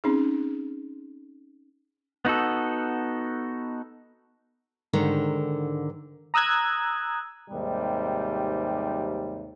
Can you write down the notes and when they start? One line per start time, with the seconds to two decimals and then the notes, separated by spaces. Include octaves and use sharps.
0.04 C4 C#4 D#4 G#4
2.25 B3 D#4 F#4 A4
4.93 G#2 D3 D#3
6.34 A#5 D#6 E6 F#6 G#6
7.50 D#2 G#2 C3 G3